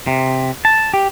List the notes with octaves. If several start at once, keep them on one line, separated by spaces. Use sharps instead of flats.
C3
A5
G4